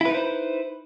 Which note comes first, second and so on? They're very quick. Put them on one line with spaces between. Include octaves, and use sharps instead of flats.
E4 B4 D#4 C5